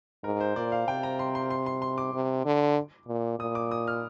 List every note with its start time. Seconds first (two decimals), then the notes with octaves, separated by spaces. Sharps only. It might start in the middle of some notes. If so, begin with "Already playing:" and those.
0.24 G#2 A#4
0.40 C5
0.56 A#2 D5
0.72 F5
0.88 C3 G5
1.03 A#5
1.19 C6
1.35 C6
1.50 C6
1.66 C6
1.82 C6
1.98 D6
2.14 C3
2.45 D3
3.08 A#2
3.39 A#2 D#6
3.55 D6
3.71 D#6
3.87 F6